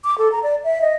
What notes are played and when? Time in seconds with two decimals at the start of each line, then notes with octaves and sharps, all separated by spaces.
0.04 D6
0.18 A4
0.32 A#5
0.43 D5
0.64 E5
0.81 D#5